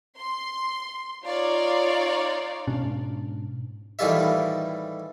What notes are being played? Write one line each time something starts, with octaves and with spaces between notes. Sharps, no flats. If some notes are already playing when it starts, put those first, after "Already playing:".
C6
D#4 F4 C#5 D5 F5
G#2 B2 C#4 D4
A2 D#3 E3 G3 F4 E5